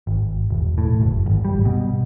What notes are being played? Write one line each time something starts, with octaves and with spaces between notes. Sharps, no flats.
G#1
E1
A2
F#1
G#1
G3
B2